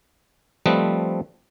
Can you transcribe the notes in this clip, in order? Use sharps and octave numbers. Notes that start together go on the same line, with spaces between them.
F3 G3 A3 C4 B4 D#5